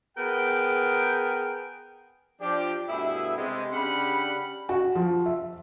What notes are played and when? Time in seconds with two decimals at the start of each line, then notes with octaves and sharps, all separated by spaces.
0.17 B3 G#4 A#4 G5
2.41 F3 D4 G4
2.88 G2 B2 A3 E4 G#4 E5
3.36 C3 G#3
3.73 C#3 D4 G4 F#5 B5
4.69 F#4
4.96 F3
5.26 E5